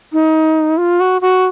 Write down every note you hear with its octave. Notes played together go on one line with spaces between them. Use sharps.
D#4
F4
F#4
F#4